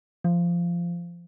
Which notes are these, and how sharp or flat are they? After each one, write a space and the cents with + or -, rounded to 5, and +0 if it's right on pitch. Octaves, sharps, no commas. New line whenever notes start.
F3 -15